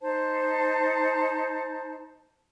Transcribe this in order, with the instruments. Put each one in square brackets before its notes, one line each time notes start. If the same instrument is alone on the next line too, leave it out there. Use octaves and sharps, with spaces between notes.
[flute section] D#4 C5 A5